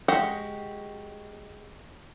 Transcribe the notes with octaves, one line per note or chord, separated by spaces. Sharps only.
G#3 F#4 G4 F#5